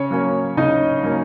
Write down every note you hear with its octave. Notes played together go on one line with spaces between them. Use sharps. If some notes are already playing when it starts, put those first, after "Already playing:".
Already playing: C#3 C#4 C#5
F#3 A#3 C#4
C#3 D#4 D#5
F#3 A#3 C#4